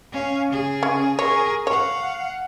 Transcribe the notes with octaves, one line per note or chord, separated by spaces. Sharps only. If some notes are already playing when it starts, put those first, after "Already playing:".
C#4 F5
C#3 G#4
C#4
G#4 A#4 C#5
C#5 F5 F#5